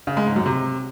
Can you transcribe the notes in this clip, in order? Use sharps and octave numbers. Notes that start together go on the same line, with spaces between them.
C#3
G#3
G#2
F#2
C3